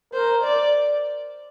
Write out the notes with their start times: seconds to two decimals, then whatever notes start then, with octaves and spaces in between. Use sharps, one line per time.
0.14 A#4 C5
0.44 D5